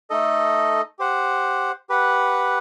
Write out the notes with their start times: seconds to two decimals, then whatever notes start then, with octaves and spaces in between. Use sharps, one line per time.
0.10 A3 D#4 A4 D#5
0.99 G4 C5 F#5
1.89 G4 B4 F#5